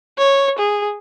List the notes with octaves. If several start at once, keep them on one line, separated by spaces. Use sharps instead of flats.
C#5
G#4